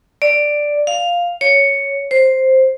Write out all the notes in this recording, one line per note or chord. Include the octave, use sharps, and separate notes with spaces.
D5
F5
C#5
C5